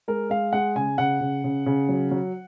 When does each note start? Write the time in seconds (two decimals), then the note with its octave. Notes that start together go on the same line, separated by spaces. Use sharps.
0.08 G#3 A#4
0.30 G#3 F5
0.53 G#3 F#5
0.75 C#3 G#5
0.98 C#3 F#5
1.21 C#3
1.44 C#3
1.66 C#3
1.89 F#3
2.11 F#3